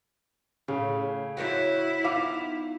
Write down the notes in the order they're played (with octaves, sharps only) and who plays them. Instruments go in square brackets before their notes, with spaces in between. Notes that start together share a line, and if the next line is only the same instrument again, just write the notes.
[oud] A2 [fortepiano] C#3
[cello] E4 [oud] F#4 C5 C#5
[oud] B3 D#4 F4 [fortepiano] F5 D6